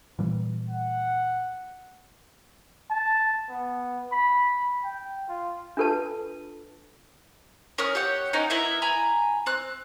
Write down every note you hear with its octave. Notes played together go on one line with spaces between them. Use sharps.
A#2 E3 G3
F#5
A5
B3
B5
G5
F4
D4 F4 A4 B4 A5
C#4 A#4 D#6 F6
G4 C#5 F#5
C#4 D#4 A#4 F#5
B3 E4 A#4 E5
G#5 A#5 B5
C4 F#6